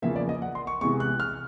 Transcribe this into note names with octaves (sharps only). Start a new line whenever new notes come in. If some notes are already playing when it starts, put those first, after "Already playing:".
E2 C#3 F3 A#3 E5
D5
D#5
F#5
C6
C#6
C3 E3 G#3 B3 C#6
F#6
F6